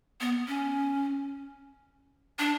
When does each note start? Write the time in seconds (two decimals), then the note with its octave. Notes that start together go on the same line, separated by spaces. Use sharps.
0.21 B3
0.48 C#4
2.39 D4